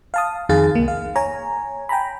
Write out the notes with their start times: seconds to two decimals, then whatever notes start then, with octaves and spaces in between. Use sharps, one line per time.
0.14 F5 A5 D#6
0.49 F2 D#3 G#4 F5 A6
0.75 C2 A#3
0.88 F5
1.16 C#5 G#5 A#5
1.89 G5 G#5 A#5 B5